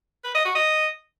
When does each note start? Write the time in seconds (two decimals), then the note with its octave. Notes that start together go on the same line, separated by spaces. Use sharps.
0.24 B4
0.34 D#5
0.45 F#4
0.55 D#5